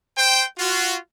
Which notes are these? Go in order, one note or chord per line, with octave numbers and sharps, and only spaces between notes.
C5 G5
F4 F#4